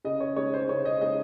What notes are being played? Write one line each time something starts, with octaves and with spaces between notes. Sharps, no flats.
C#3 D#5
C#5
G#3 D#4 C#5
C5
C#3 C#5
D#5
G#3 D#4 D#5